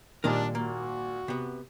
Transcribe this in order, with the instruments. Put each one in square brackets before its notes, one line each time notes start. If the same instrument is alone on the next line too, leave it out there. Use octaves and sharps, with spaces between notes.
[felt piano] G#1 A#2 G3 [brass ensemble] D4 [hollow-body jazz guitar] A#4 D5 D#5
[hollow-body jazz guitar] A#3 [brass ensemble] F#4
[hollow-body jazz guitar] C3 B3